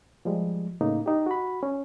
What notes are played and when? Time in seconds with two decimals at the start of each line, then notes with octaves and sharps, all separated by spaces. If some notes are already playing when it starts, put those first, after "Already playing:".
0.25 F3 G3 G#3
0.81 A2 C#3 A#3 D#4
1.06 D#4 G4
1.26 F#4 B5
1.63 C#4